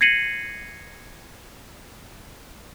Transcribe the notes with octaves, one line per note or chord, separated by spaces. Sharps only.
G#6 A#6 C7 C#7 D#7 F#7